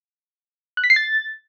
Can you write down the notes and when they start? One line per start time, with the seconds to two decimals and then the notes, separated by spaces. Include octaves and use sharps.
0.77 F#6
0.84 B6
0.90 C7
0.96 A6